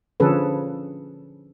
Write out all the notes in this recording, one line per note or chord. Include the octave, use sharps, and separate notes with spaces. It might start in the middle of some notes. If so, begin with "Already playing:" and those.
D3 F3 C#4 G#4 A4 B4